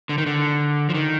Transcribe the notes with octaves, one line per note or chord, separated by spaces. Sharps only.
D3
D#3
D3
F3
D#3